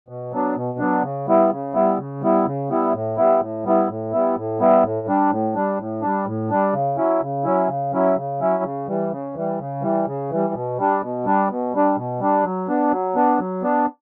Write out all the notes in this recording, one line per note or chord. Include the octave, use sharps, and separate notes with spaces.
B2
F#3 B3 D4
B2
F#3 B3 D4
C#3
G3 B3 E4
C#3
G3 B3 E4
C#3
G3 B3 E4
C#3
G3 B3 E4
A2
G3 B3 E4
A2
G3 B3 E4
A2
G3 B3 E4
A2
G3 B3 E4
A2
G3 D4
A2
G3 D4
A2
G3 D4
A2
G3 D4
C#3
F#3 C#4 E4
C#3
F#3 C#4 E4
C#3
F#3 C#4 E4
C#3
F#3 C#4 E4
C#3
E3 G3
C#3
E3 G3
C#3
E3 G3
C#3
E3 G3
B2
G3 D4
B2
G3 D4
B2
G3 D4
B2
G3 D4
F#3
B3 D4
F#3
B3 D4
F#3
B3 D4